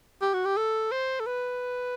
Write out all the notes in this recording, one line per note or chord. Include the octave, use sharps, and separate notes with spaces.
G4
F#4
G4
A4
C5
A4
B4